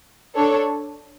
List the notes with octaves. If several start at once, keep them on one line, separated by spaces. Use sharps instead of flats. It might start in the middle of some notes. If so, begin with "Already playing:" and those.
D4 A4 C#5